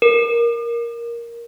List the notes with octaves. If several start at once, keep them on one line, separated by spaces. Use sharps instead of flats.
A#4